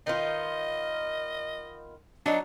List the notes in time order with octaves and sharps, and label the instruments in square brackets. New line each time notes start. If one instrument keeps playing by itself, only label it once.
[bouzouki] D#3 B3 F4 [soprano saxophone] D#5
[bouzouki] F#3 D#4 [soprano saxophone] D4